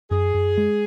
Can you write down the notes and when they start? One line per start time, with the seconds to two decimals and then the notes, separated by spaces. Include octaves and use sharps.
0.11 F#2 G#4
0.34 F#2
0.58 G#3